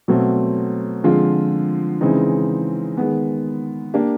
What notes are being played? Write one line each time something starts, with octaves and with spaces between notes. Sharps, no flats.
B2 F#3 A3 C4
D3 F3 G#3 C4 F4
C#3 E3 G#3 C4 D#4
D#3 G#3 B3
A#3 D4 G4